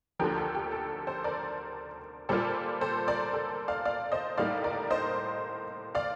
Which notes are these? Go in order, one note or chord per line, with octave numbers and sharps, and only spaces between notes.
D2 D3 F3 G4 A#4
A4
G4
A4
A4 C5
A#4 D5
A#2 G3 A#3 F4 A4 C5
A4 C5
A#4 D5
A4
D5 F5
D5 F5
C5 D#5
A2 G3 A#3 D#4 D5 F5
A#4 D5
C5 D#5
D5 F5